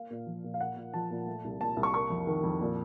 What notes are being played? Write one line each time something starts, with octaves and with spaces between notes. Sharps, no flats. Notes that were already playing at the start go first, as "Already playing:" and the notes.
Already playing: A#3 F5
A#2
F3
A#2
F5
A#3 F#5
A#2
F3 A5
A#2
A3
C2
A#2 A5
C2
C#6
A#3 C#6
F2
D#3
F2
A#2